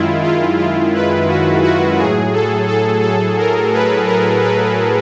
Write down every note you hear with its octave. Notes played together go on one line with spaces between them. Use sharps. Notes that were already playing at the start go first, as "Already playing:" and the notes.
Already playing: F#2 D#3 G#3 E4 F4
F4
F4
B4
F#4
F#4
A2 F#3 G#4
A4
A4
A4
A#4
B4
A#4
B4